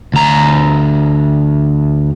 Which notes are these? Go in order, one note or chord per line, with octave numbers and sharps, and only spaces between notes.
D2 A#5